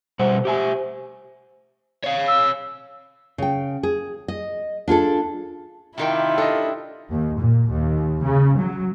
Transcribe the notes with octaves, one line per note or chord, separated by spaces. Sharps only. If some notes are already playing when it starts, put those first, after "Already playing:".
B2 G3 C5 F#5
G4 E5 G#5
C#5 F5
E6
C#3 G5
G#4
D#5
D4 F4 G#4 A4
C3 D#3 E4 F4 G4
D4 A4 D#5
D#2
A#2
D#2
C#3
F#3